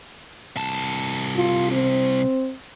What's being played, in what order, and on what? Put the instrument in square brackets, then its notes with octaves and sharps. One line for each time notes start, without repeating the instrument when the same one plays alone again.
[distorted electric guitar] C2 A5
[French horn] F4
C4